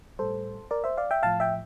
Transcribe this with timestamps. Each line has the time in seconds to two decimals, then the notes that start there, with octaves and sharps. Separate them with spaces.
0.19 A2 G3 A4 C5
0.71 A#4 D5
0.84 C5 E5
0.97 D5 F5
1.11 E5 G5
1.23 A2 F3 F5 A5
1.40 E5 G5